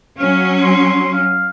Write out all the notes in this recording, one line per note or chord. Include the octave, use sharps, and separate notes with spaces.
F#3 C#4 F5
C6
F5